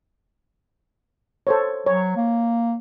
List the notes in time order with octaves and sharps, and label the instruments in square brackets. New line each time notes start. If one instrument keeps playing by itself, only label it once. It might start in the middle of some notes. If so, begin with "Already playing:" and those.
[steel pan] A4 C5 C#5
[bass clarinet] F#3 [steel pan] C#5
[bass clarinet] A#3